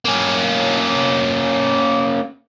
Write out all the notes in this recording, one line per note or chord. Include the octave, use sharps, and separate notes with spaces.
A#3 C#4